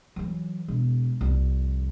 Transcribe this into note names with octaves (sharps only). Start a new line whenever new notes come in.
E3 F#3
E1
C2 F2